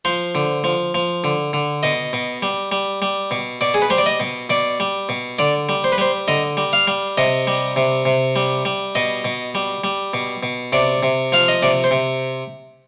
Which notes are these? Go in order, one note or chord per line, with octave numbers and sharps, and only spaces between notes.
F3 C5
D3
F3
F3
D3
D3
B2 D#5
B2
G3
G3
G3
B2
B2 D5
G#4
B4
G3 C5
D5
D#5
B2
B2 D5
G3
B2
D3 D5
G3
C5
B4
G3 C5
D3 D#5
G3
F5
G3
C3 D#5
G3
C3
C3
G3
G3
B2 D#5
B2
G3
G3
B2
B2
C3 D5
C3
F3 F5
D#5
C3 D5
C5
C3